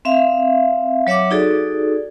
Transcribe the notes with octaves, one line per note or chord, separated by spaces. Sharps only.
C4 E5 F5
F#3 C#5 E5 F#5 D6
D#4 F#4 G#4 A4 D5